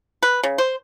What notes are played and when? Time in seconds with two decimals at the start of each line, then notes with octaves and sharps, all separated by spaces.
0.22 B4
0.43 C#3
0.58 C5